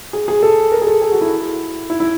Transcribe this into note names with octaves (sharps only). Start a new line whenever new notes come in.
G#4
G#4
A4
A#4
G#4
A4
G#4
F#4
E4
E4
E4